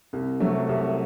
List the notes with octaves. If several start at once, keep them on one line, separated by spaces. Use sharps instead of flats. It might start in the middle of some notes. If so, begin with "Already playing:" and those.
C2
C3 F#3 A3
C2